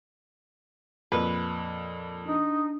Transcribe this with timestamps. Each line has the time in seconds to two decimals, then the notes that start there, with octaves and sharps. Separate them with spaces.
1.12 F2 A#2 B4
2.25 D4 D#4